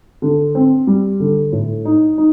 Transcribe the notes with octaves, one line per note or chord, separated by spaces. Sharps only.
D3
C4
G3
D3
A2
D#4
D#4